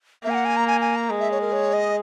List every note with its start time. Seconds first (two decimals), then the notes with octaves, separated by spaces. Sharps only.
0.24 A#3 E5
0.30 G#5
0.35 F#5
0.45 G#5
0.57 A#5
0.67 G#5
0.81 G#5
0.96 A#5
1.10 G#3
1.20 E5
1.31 C#5
1.41 A#4
1.52 C#5
1.73 D#5